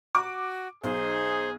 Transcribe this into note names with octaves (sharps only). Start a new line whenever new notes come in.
F#4 D6
B1 D#4 G#4 C5